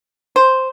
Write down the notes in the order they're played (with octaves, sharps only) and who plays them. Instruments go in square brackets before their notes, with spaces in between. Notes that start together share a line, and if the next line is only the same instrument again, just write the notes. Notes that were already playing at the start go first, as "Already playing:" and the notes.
[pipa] C5